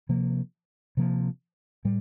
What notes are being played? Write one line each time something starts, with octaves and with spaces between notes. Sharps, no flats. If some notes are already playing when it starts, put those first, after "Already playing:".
C3 F3 A#3
C3 F3 A#3
A2 G3